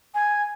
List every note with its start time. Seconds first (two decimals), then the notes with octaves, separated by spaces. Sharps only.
0.14 G#5